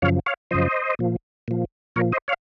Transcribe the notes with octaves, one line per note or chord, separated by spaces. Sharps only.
F#2 C#3 F3 C#5 F5
C#5 F5
F#2 C#3 F3 C5 D#5
A#2 F3
A#2 F3
A#2 F3 A#4 C#5
C5 D#5
C#5 F5